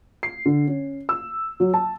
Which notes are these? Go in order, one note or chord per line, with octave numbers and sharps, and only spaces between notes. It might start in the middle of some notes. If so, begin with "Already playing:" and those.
C7
D3
C#4
E6
F#3
A5